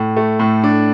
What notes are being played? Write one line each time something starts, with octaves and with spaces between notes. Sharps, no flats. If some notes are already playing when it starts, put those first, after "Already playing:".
Already playing: A2
A3
A2
D4